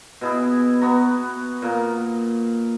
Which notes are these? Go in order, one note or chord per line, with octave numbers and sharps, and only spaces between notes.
B2 E4 G#4
B3 F#4 A#5
A#2 A#3